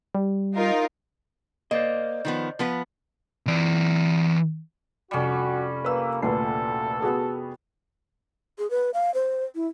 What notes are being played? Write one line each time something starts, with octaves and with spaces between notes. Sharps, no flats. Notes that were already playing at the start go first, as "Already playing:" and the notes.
G3
D#4 F4 A#4
A#3 C5 D5 D#5
D#3 F3 B3
F3 B3 B4
E3 D5
F1 G3 C#4 F#4 E7
A#3 B4 E6
D2 A#2 A4 B4 C7
B3 F#4 G#4
G#4
B4
F5
C5
E4